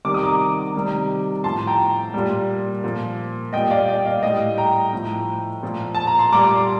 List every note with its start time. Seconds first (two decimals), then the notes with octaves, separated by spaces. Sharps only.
0.05 C3 D#3 G3 D6
0.14 D#6
0.24 A#5 D6
0.75 C3 D#3 G3
1.44 A2 F3 A5 C6
1.67 G5 A#5
2.14 A#2 G3
2.84 A#2 F3
3.53 A#2 G3 D#5 G5
3.71 D5 F5
3.88 D#5 G5
4.06 D5 F5
4.23 A2 G3 D#5 G5
4.58 G5 A#5
4.93 A2 F3
5.63 A#2 F3
5.95 A5
6.07 A#5
6.19 C6
6.32 A#2 G3 A#5 D6
6.56 C6